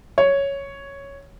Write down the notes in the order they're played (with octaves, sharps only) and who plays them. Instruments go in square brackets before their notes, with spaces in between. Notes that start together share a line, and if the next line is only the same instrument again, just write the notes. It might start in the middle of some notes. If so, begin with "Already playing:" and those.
[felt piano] C#5